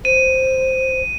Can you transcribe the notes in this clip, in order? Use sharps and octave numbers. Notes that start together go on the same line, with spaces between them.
C5 D#7